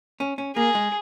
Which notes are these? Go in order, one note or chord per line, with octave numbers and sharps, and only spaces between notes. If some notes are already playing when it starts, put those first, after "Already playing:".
C#4
C#4
A#3 G#4
G#3